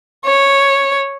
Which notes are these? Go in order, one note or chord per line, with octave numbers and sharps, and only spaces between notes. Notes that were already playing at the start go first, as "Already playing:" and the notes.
C#5